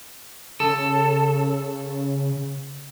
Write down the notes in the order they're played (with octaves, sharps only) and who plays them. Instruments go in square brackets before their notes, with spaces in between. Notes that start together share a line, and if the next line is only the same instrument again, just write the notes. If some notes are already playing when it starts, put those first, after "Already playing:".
[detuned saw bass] C#3 [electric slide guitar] A4